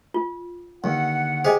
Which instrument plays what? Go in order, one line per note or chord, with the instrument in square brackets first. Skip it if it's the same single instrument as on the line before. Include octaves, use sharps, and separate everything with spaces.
[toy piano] F4
[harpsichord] D#2 [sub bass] D3 [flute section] F#5
[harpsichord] G4 G#4 [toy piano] C5 D#5 G#5